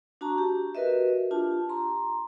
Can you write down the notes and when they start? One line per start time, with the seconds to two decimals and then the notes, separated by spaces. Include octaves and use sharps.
0.21 D4 F#4 A5 A#5 C#6
0.38 G4
0.75 F#4 A#4 B4 D#5 E5
1.31 D4 F4 G4 A5
1.69 A#5 C6